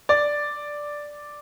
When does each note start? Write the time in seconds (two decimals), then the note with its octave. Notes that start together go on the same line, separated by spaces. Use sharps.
0.09 D5